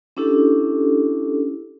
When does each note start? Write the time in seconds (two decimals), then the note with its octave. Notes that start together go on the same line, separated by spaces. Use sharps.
0.17 C#4 D4 E4 G4 A4